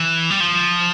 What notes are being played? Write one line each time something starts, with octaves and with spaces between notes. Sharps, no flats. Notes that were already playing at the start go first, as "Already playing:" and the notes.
Already playing: E3
G3
F3